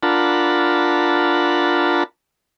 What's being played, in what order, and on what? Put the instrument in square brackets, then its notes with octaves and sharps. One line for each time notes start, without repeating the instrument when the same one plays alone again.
[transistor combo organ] D4 F4 A#4 F#5 A5 B5